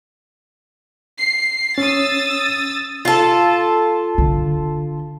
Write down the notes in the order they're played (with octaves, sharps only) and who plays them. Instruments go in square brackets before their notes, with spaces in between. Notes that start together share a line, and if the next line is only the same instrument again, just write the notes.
[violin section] C7
[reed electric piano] C#4 [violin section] D#6 E6 A6
[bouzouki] F4 A4
[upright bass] D3